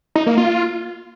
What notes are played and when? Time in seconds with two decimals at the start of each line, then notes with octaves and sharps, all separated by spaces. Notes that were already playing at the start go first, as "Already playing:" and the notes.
0.16 D#4
0.26 A#3
0.37 F4